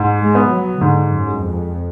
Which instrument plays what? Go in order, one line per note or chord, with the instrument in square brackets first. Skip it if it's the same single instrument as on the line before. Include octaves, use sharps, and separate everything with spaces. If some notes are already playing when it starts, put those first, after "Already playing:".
Already playing: [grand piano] G#2
[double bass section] G#3
[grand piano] B3
[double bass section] F#3
[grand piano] G#2 [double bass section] D3
[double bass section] F#2
[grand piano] G#3
[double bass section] F2